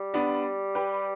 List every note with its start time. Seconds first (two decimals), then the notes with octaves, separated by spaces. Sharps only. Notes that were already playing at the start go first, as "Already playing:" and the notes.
Already playing: G3
0.14 B3 D4
0.75 G4 B4